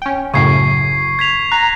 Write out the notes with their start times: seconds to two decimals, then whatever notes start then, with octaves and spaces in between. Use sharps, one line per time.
0.02 C#4 G5
0.34 F#2 A2 C#3 C#6 G#6 C7
1.19 G#6 B6 F7
1.52 A#5 F#6 A#6